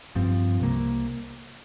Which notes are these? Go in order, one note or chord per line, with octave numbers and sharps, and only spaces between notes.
G2 F3 C4
C2 C3 A#3